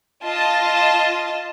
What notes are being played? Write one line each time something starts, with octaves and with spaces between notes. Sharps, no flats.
F4 D#5 A5